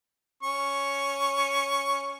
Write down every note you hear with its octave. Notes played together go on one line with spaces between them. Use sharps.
C#4 C#6